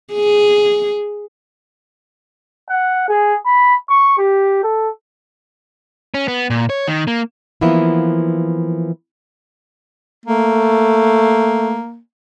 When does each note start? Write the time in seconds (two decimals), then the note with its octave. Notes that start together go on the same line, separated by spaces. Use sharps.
0.13 G#4
2.69 F#5
3.09 G#4
3.45 B5
3.89 C#6
4.18 G4
4.63 A4
6.14 C#4
6.28 B3
6.50 A#2
6.70 C#5
6.88 D#3
7.07 A#3
7.61 E3 F3 A#3 B3 E4
10.26 A3 A#3